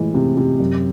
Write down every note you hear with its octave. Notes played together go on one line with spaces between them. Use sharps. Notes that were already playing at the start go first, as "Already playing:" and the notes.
Already playing: A2 E3 G#3
C3
C3
F#2